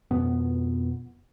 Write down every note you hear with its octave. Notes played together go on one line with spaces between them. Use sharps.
F2 B2 B3